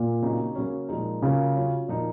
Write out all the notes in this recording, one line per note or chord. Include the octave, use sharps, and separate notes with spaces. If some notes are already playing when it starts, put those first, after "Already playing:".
Already playing: A#2
C#3 F#3 C4 D#4
C#3 F#3 A#3 C#4
A#2 F3 G#3 D#4
C#3 F#3 A#3 F4 A#4
F#3 C#4 F4
A#2 F3 A#3 D#4